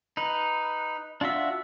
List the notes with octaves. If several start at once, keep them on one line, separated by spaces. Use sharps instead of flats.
D#4 B4
D4 F4 F#4 E5